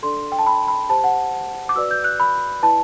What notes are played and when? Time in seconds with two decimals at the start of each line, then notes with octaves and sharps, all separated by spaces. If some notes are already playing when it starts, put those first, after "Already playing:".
0.02 D4 A4 D5 C6
0.32 G5
0.39 A5
0.46 B5
0.68 B5
0.89 G4 C5 A5
1.04 F#5
1.69 D6
1.75 F#4 B4 D5 E6
1.91 G6
2.04 F#6
2.20 B5
2.62 E4 B4 D5 A5